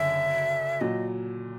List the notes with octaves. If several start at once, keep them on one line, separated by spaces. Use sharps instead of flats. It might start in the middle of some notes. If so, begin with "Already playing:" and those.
Already playing: F#1 F#2 D3 E5
A#2 F#3 D#5